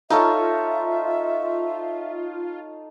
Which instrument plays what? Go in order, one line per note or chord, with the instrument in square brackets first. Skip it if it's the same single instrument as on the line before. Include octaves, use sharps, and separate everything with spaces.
[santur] D#4 A4 C#5 [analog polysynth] F4 [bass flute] E5